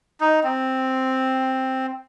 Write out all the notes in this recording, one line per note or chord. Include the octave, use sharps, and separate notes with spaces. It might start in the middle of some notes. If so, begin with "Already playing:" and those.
D#4
C4